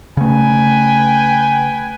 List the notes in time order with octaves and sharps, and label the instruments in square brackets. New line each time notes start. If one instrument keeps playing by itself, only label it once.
[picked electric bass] C#3 A3 [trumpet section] B4 G5 G#5